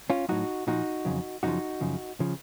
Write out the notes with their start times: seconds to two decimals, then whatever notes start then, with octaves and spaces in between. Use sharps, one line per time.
0.10 C#4 F4
0.29 A2 F#3 D#4 F#4
0.67 A#2 F3 D#4 F#4
1.05 F2 C#3 F#3
1.43 F#2 C#3 F3 D#4 F#4
1.81 F#2 C#3 F3
2.20 C#3 F3